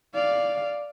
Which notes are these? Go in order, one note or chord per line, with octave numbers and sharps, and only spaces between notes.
D5 F5